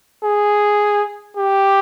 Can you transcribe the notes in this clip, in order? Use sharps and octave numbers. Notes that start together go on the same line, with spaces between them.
G#4
G4